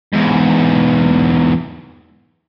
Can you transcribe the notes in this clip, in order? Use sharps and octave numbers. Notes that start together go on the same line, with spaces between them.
E2 G#2